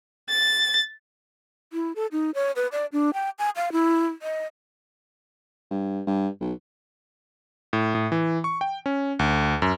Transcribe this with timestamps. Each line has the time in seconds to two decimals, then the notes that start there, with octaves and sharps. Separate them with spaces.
0.30 A6
1.73 E4
1.96 A4
2.12 D#4
2.35 C#5
2.56 B4
2.72 D5
2.92 D4
3.14 G5
3.39 G#5
3.56 F5
3.72 E4
4.22 D#5
5.71 G2
6.07 G2
6.41 B1
7.73 A2
7.95 A2
8.12 E3
8.44 C#6
8.61 G5
8.86 C#4
9.19 D2
9.62 F#2